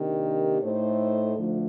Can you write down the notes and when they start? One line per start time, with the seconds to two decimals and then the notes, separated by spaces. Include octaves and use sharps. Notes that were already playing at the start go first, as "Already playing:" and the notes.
Already playing: C3 D#3 A#3 D4 G4
0.61 A2 A3 D#4 A4 C5
1.37 D2 D3 F3 A3